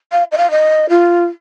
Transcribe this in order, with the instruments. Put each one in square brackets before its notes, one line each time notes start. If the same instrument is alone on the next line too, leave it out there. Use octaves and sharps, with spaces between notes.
[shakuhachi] F5
D#5
F5
D#5
F4